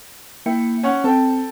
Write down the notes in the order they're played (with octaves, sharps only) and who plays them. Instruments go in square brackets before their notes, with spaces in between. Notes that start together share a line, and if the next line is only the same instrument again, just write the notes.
[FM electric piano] A#3 G5 C#7 [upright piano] E4
[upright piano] C#4 C#5 F#5
[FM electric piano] C4 [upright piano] A4 G5